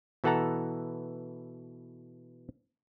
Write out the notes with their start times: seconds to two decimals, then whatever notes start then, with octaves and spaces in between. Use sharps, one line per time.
0.24 B2 E3 A4 F#5 A5 A#5